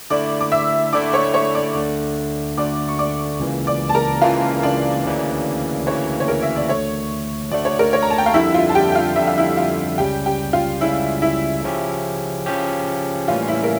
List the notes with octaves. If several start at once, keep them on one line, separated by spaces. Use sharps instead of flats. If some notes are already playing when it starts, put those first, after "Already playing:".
D3 A3 E4 D5 D6
D6
E5 E6
D3 A3 E4 D5 D6
C#5 C#6
C#5 C#6
D5 D6
D2 D3 A3
D2 D3 A3 D5 D6
C#6
D5 D6
C#2 C#3 E3 A#3
D5 D6
A5
A#4 A#5
C#2 C#3 E3 A#3 F4 F5
D4 D5
D2 C#3 E3 A#3
D2 C#3 E3 A#3 C#5
C#5
A#4
E5
D5
D2 D3 A3 C#5
D2 D3 A3 D5
C#5
A#4
C#5
A#5
A5
G5
F5
F2 D3 G3 E4 E5
F4 F5
A5
G4 G5
G5
F4 F5
F2 D3 G3 E5
F5
E4 E5
F4 F5
C#2 C#3 G3 C#4 G4 G5
G4 G5
F4 F5
C#2 C#3 G3 C#4 E4 E5
E4 E5
C#3 F3 C#4 G4
C#3 F3 C#4 G4
A2 E3 G3 A#3 C#4 F4 F5
E4 E5
A#4